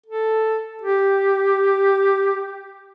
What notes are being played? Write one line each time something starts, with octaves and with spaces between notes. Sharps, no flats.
A4
G4